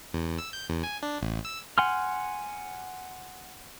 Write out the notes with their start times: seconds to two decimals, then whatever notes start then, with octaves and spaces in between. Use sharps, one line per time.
0.14 E2
0.38 E6
0.53 G6
0.69 E2
0.84 G#5
1.03 D4
1.21 A1
1.45 E6
1.78 F#5 G#5 C6 F6